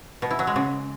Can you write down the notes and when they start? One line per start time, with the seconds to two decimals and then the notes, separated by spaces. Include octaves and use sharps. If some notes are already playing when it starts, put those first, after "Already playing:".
0.22 B2
0.31 E4
0.39 F#3
0.47 G#3
0.56 C#3